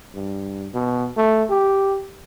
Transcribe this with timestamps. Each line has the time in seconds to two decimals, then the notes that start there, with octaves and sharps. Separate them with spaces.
0.14 G2
0.74 B2
1.17 A3
1.49 G4